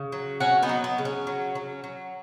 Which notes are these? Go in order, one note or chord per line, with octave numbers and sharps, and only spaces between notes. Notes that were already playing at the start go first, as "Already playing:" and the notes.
Already playing: C#3
F#3
F#3 C#4 F#4
B3 D#4
F#3
B3
C#3
C#4
F#3
F#3
F#3